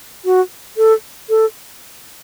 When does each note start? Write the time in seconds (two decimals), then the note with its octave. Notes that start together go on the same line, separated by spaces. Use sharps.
0.25 F#4
0.77 A4
1.29 A4